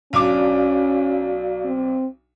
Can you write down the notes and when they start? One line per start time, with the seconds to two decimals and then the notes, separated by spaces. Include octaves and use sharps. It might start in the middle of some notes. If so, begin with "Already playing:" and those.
0.13 B1 C#4 D4 F#4 D5 F5 D6
1.65 C4